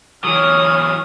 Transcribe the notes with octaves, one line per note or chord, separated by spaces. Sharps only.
E3 F#3 C#5 D#6 F6